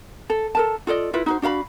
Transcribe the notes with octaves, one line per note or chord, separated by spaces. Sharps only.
A4
A4 A#4 A5
F4 A4 D5 D#5
E4 F4 B4
D#4 F#4 C5
D4 F#4 F5 B5